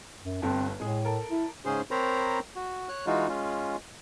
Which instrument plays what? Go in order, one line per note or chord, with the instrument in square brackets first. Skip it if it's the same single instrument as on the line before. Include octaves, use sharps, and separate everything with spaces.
[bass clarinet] F#2
[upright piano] G1 G2 A4 [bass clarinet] C4
[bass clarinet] A2 [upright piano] G#3 G#4
[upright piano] A4 A#4
[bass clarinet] E4
[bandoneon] G#2 C#3 C#4 G#4 C5 C6
C4 A#4 C5 C#5 A#5 B5
F#4
C#5 F#6
E3 G#3 D#4 F4 F#4
G#3 C#4 F4